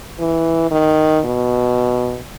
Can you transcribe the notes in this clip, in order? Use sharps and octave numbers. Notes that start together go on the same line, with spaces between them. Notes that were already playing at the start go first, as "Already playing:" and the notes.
E3
D#3
B2